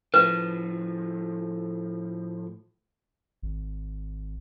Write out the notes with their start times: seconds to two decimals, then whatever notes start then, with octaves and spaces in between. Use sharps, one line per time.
0.14 A2 F3 B4
3.42 G#1